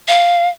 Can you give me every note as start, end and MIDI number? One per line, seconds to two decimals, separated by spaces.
0.08 0.49 77